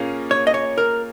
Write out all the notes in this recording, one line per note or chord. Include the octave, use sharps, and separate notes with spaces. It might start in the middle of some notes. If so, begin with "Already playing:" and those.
Already playing: A#2 A#3 C#4 G#4
C#5
D#5
C#5
A#4